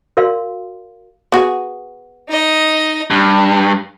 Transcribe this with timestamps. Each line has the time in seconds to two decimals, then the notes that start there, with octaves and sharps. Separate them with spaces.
0.17 F#4 A#4 D5 F5 C6
1.32 B3 F#4 G#4
2.29 D#4 D#5
3.11 G2